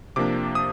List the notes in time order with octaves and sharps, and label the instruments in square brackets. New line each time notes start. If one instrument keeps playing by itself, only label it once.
[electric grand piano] C3 F3 A#3 D4 D6
D#6